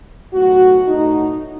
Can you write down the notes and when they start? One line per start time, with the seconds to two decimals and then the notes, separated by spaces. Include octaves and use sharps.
0.33 B1 A2 F#3 A3 F#4
0.88 B1 A2 F#3 A3 D#4